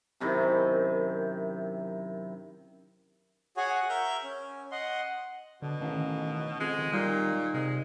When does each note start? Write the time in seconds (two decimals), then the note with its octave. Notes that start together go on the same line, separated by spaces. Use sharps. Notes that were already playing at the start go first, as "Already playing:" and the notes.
0.20 F#2 C3 D#3 E4
3.57 F#4 G#4 C#5 F#5 G#5
3.89 A#4 E5 F6 G6
4.23 C#4
4.72 D#5 F#5 C6
5.62 B2 D3
5.81 A1 D#3
6.60 F2 G#3
6.78 D#3
6.93 A#2 D#3 G3
7.54 C3 G#3